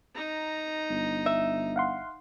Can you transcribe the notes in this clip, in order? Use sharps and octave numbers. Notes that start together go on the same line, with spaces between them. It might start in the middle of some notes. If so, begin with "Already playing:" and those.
D#4 A#5
G1
E5
F5 F#5 C6